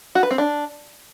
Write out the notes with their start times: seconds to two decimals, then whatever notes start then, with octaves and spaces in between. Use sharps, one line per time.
0.15 F#4
0.23 B4
0.31 C4
0.38 D4